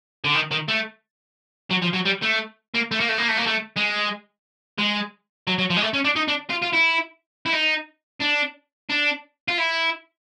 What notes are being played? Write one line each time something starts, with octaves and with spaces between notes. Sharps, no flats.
D3
D#3
D#3
A3
F#3
F3
F#3
G3
A3
A#3
A3
A#3
A3
A#3
A3
A#3
A3
G#3
G#3
F#3
F#3
F3
G#3
A3
C#4
D4
D#4
D4
F4
F4
E4
E4
D#4
D4
D4
F4
E4